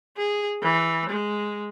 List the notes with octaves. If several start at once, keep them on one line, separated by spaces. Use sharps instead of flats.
G#4
E3
G#3